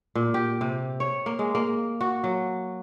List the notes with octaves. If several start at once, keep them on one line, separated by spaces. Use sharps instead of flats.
A#2
G4
C3
C#5
A#3
G#3
A#3
F#4
F#3